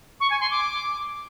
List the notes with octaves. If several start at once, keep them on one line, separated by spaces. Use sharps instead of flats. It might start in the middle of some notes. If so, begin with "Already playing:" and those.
C#6
G#5
C6
D6